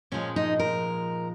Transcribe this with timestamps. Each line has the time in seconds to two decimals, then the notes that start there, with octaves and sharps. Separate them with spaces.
0.12 A#2 F3 G#3 C#4
0.36 D#4
0.59 A#4